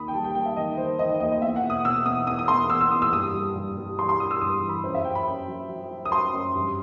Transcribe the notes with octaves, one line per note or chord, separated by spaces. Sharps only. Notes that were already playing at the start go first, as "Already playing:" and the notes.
Already playing: D#2 D#3 B5 D#6
G5
G3 A5
G5
D#2 G5
E5
D#3 D#5
D#3 C5
D#3 D#5
D#5
D#2 D#5
D#5
E2 E5
F#5
B2
D#6
B2 E6
E2 D#6
E2 D#6
D#6
E2 C6
E2 E6
E6
E2 D#6
E6
G2 D#6
G3
G2
G3
G3 C6
C6
G3 D#6
E6
G2 D#6
E3
B5
F#2 C5
E5
F#2 G5
B5
F#2
F#3
F#3
F#3
D#6
F#3 C6
F#2
G2